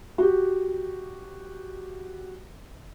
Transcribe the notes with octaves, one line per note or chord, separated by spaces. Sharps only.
F#4 G4